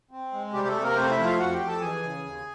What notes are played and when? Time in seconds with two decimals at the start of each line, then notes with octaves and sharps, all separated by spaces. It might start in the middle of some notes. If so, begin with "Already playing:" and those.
0.11 C4
0.33 G#3
0.53 C3 G3 G4
0.68 A3 A4
0.75 C3
0.82 A#3 A#4
0.96 A3 C4 C5
1.10 E4 E5
1.18 F3
1.24 F4 F5
1.39 F2 F#4 F#5
1.53 G4 G5
1.60 F2
1.67 A4 A5
1.81 E3 G#4 G#5
2.03 C#3
2.23 D#2